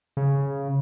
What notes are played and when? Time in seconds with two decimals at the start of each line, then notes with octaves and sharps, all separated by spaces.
0.17 C#3